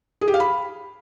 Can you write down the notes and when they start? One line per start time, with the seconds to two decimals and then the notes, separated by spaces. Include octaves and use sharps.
0.21 G#4
0.28 G4
0.34 F5
0.40 B5